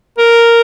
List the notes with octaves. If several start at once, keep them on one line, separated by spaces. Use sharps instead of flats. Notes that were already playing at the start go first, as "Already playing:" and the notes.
A#4